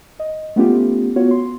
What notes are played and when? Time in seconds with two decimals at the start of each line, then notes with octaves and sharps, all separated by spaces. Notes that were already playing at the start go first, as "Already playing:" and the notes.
0.20 D#5
0.56 A3 B3 C#4 F4 G4
1.16 B3 F4 F#4 C#5
1.31 C6